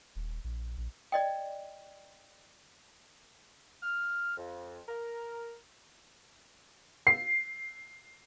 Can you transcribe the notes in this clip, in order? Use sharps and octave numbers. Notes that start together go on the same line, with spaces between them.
D#1
A#1
A#1
D5 D#5 G5
F6
F2
A#4
C7